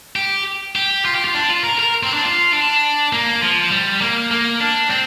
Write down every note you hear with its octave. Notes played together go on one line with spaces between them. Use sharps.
G4
G4
F4
G4
F4
D4
F4
A#4
A#4
C4
D4
F4
D4
A#3
F3
G3
A#3
A#3
D4
C4